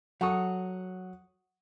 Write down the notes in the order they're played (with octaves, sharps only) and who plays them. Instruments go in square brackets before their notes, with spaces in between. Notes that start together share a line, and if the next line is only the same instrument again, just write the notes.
[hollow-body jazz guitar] F#3 A4 [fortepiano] F#5 C#6 D#6